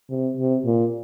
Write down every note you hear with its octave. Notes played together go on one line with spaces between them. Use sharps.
C3
C3
A#2